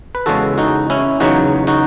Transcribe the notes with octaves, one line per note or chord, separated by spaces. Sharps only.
B4
E2 C#3 G#3 F#4 A4
D#4 F#4
C#4 E4
E2 C#3 F#3 D#4 F#4
D#4 F#4